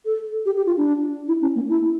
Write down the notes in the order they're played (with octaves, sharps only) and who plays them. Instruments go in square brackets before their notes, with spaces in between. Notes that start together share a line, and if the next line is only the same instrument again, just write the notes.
[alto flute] A4
G4
G4
F4
D4
E4
C#4
A#3
E4